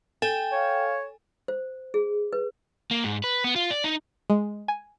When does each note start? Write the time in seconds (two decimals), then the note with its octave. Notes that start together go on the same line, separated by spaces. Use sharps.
0.22 A4 G5 G#5
0.53 C#5 F5
1.48 C5
1.94 G#4
2.33 B4
2.91 A#3
3.04 G#2
3.24 B4
3.44 B3
3.56 F4
3.71 D5
3.84 D#4
4.30 G#3
4.68 G#5